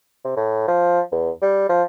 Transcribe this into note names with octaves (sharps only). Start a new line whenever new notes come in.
C3
A2
F3
E2
G3
F3